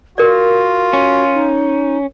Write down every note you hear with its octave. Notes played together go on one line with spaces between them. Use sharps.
F4 F#4 A#4 D5
C#4
D#4